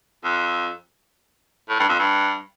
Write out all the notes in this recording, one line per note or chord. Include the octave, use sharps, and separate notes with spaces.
F2
A2
G2
F2
G2